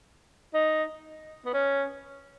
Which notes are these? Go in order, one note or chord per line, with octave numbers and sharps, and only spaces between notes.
D#4
B3
C#4